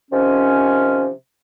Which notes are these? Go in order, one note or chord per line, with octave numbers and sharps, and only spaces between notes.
C3 D#3 F3 C#4